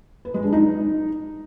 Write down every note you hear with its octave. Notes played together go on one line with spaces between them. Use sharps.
B4
G#3
D4
D#4